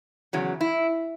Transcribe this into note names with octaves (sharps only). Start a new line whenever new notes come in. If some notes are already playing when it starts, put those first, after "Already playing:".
E2 C#3 F#3
E4